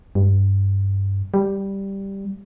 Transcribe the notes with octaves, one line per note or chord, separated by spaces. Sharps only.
G2
G3